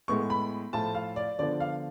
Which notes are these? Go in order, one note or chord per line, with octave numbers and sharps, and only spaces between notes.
A2 G#3 B3 C#6
B5
A2 F3 A3 F4 A5
F5
D5
D3 F3 B3 D4 D5
F5